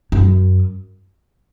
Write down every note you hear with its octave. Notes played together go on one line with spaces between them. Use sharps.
F#2